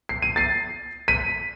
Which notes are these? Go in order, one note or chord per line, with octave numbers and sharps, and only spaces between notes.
C7
D#7
A6 C7
B6 D#7